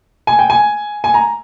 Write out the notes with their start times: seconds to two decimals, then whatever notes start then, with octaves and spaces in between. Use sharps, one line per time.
0.27 G#5
0.39 G5
0.50 G#5
1.04 G#5
1.14 A#5